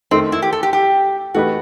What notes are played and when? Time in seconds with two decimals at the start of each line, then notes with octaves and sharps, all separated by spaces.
0.11 D#3 A3 C4 D#4
0.32 E4
0.42 G4
0.52 A4
0.63 G4
0.73 G4
1.34 E3 A3 D#4 F#4 G4 B4